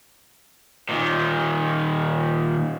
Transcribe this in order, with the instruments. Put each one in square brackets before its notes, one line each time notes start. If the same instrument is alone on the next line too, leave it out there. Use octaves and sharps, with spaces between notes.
[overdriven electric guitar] A#2 D#3